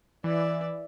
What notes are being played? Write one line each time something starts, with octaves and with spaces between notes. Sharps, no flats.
E3 D5 E5